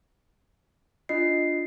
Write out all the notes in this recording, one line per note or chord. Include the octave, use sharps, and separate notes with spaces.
D4 F4 D#5 C7